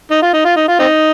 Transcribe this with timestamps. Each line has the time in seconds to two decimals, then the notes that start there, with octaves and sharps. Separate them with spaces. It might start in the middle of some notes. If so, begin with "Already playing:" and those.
0.11 D#4
0.22 F4
0.33 D#4
0.45 F4
0.56 D#4
0.68 F4
0.79 C4 D#4